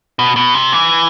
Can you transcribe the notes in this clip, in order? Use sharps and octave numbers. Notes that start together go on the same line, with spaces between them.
B2
B2
C3
E3